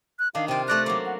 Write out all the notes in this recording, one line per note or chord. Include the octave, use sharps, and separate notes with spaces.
F#6
D#3 D4 F5
C3 F4 G5
A3 D5 A#5 F#6
F#3 A#3 D6
F#5